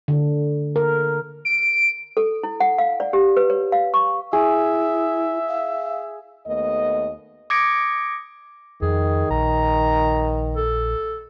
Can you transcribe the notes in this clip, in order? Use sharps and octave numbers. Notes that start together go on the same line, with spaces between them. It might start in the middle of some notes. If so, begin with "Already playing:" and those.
D3
A#4
D7
A4
E4
F#5
F5
D5
G4
B4
C#5
F5
C#6
E4 G#4 E5
F5
D#2 A3 B3 D#5
D6 D#6 G#6 A#6 C#7 D7
F2 D#3 G#4
A#1 A#5
A4